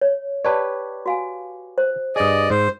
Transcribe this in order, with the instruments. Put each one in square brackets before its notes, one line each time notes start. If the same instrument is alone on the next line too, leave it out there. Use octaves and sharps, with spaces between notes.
[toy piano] C#5
[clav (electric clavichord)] G4 B4 C#5 [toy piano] D5 A5
[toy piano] F#4 F5 G#5
C5
[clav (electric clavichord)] G2 G#4 [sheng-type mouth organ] D5 D#5
[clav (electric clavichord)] G#2 [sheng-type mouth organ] C5